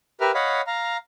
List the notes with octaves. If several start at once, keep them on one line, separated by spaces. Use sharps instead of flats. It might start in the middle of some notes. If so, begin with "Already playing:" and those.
G4 A#4 B4 E5 F6
C#5 D#5 F5 F#5 B5
F5 A#5